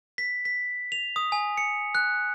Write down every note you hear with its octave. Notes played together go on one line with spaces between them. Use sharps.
B6
B6
F7
D#6
G#5
C#7
F#6